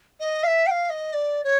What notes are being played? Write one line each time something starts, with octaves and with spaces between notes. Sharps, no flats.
D#5
F5
E5
G5
F5
D#5
D5
C#5